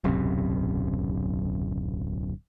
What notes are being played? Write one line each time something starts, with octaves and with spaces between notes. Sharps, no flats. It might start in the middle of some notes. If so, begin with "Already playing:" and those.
D1 B1 F#2 C3